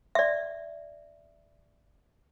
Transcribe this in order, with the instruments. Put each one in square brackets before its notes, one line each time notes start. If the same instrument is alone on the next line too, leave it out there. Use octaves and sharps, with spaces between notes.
[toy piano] D5 E5